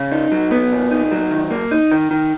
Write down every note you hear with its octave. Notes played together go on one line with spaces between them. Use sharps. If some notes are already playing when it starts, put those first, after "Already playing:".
Already playing: C#3
D#4
F#3
B3
A#2
D#4
F#3
D#3
A#3
D#4
D#3
D#3